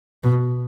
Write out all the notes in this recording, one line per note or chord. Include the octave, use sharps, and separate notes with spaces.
B2